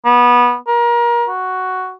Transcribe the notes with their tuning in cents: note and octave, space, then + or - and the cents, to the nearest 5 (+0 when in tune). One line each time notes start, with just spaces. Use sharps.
B3 -20
A#4 +30
F#4 +5